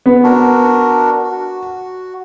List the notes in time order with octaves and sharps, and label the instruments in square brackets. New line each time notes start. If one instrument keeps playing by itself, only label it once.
[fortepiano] B3
[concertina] D4 F#4 A#4
F#4